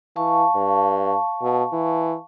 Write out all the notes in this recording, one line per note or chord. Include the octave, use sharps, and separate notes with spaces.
E3 F5 A5 C#6
G2
B2
E3